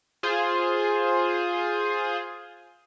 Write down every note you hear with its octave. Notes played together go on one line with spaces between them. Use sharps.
F4 G#4 C5